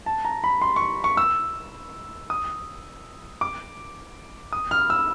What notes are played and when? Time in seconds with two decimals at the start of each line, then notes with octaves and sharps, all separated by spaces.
0.06 A5
0.25 A#5
0.44 B5
0.62 C6
0.76 C#6
1.04 C#6
1.17 E6
2.30 D#6
3.41 D6
4.53 D#6
4.71 F6
4.90 E6